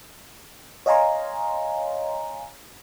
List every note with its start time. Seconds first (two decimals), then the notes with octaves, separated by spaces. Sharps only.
0.86 C#5 D#5 F5 G#5 A#5 C6